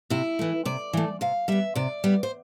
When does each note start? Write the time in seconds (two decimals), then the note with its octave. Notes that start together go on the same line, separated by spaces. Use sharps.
0.10 C3 E4
0.39 E3 A3
0.65 C3 D5
0.93 E3 A3
1.21 C3 F5
1.48 G3 B3 E5
1.75 C3 D5
2.04 G3 B3
2.23 C5